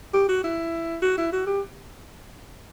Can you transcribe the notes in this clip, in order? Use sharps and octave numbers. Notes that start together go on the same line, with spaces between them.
G4
F#4
E4
F#4
E4
F#4
G4